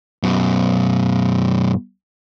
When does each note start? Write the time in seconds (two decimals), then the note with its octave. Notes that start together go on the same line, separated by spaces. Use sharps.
0.23 F#2 B2